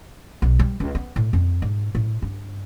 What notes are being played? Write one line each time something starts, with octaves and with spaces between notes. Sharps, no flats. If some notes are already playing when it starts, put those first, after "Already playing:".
B1
G3
C#2
B3
A2
F2
G#2
A2
G2